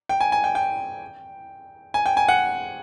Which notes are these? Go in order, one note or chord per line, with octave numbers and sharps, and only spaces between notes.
G5
G#5
G#5
G5
G5
G#5
G5
G#5
F#5